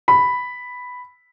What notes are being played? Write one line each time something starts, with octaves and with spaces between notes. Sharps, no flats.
B5